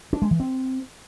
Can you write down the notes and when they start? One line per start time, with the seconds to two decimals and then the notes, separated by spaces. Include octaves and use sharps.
0.13 D4
0.22 G#3
0.31 E3
0.40 C4